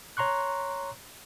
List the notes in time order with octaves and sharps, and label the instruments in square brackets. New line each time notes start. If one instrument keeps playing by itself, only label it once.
[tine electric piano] C#5 A#5 C6 C#6 F#6